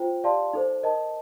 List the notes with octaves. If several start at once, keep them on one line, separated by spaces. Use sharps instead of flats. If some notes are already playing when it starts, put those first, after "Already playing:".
Already playing: F4 C5 G5
G4 D5 F5 A5 C6
D#4 A4 C5
A#4 D#5 A5